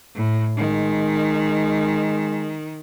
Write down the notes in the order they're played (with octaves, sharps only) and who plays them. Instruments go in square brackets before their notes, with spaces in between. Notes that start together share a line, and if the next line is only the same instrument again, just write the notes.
[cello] A2
[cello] D#3 [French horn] G#3